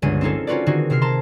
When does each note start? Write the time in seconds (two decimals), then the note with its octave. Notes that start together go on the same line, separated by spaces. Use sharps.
0.02 G1 C#2 G#3 D#7
0.21 C4 C#4 D#4 F4 G#4 A4
0.47 C#4 D#4 F4 F#4 B4 D5
0.66 D3 D#3 C4 D#4 F#4 G#4
0.90 C3 C4 A#4 F6 C7
1.02 A5 A#5 C6